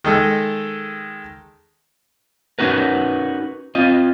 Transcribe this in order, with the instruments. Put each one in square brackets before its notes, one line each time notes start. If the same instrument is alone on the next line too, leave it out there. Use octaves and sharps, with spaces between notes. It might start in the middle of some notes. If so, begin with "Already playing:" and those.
[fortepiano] D#3 G#3 A4
[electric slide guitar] C#4 D#4 F#4 A#4 B4
C4 F4 D#5